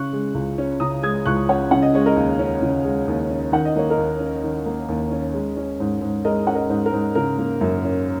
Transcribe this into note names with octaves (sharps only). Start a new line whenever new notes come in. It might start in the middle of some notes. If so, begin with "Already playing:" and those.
Already playing: C#3 C#6 F#6
G#3
C#2
C#4
C#3 A#5 D#6
G#3 D#6 G#6
C#2 C#6 F#6
C#4 C#5 F#5
C#3 F#5
D#5
G#3 C#5
A#4 D#5
D#2
C#4
C#3
G#3
D#2
C#4
D#3 F#5
D#5
A#3 C#5
A#4 D#5
D#2
C#4
D#3
A#3
D#2
C#4
G#3
C#4
G#2
G#2
G#3 A#4 D#5
C#4 F#5
A#4 D#5
G#2
A#4
G#2
C#3 A#4
A#3
F#2
C#4